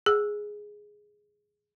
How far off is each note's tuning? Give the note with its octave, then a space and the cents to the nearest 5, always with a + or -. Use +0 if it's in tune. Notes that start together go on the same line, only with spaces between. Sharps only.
G#4 +0 E6 +0